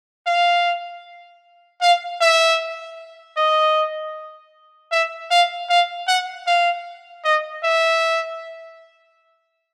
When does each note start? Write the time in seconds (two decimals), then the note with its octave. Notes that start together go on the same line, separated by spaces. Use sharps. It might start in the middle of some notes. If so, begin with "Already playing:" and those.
0.26 F5
1.81 F5
2.21 E5
3.37 D#5
4.91 E5
5.30 F5
5.69 F5
6.08 F#5
6.46 F5
7.24 D#5
7.63 E5